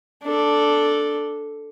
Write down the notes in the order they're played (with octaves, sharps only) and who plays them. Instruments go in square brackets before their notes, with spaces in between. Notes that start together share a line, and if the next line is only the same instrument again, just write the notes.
[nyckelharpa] D4 A4